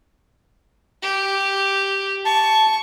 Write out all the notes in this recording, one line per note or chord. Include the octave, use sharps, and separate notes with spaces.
G4
A5 C#6